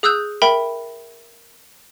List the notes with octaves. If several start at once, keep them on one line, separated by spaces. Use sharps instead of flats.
G#4 D#6 E6 F#6 G6
A#4 E5 G5 B5